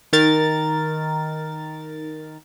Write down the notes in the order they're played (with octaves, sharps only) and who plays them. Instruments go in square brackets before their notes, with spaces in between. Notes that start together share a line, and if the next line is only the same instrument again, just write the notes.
[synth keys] D#3 A#4 A6